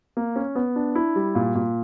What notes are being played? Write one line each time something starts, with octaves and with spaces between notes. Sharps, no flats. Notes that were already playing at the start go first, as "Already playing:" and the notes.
A#3
C#4
B3
D4
E4
G3
A#2
A#2